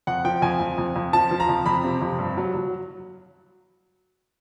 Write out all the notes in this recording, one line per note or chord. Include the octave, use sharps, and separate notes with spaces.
F2 F#5
F3 G5
F2 G#5
F2
F2
F2
F3 A5
F3
A#5
F2
F2 B5
C3
F2
G2
F#3
F#3